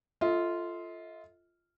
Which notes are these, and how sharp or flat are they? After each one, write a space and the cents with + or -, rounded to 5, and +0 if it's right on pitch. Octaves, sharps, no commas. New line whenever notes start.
F4 -10 A4 +0 D#5 +45